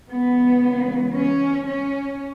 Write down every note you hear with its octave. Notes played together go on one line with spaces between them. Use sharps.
C#3 E3 G#3 B3
C#4
C#4